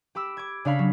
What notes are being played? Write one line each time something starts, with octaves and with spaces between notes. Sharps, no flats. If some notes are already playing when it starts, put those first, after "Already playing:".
G4 B5 D6 E6
D6 G#6
C#3 D4 C#5 F5 B5 B6
F#3